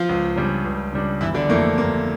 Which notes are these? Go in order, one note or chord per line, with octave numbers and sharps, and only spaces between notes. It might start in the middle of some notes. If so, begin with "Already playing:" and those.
Already playing: F3 F4
C#2
C#3 G3 D4
C#2
C#3 G3 D4
G1 E3 E4
D3 D4
F2 E3 A3 A#3
G1 A#3